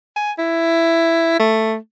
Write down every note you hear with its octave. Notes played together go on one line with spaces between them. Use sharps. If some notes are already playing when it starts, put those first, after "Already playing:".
G#5
E4
A3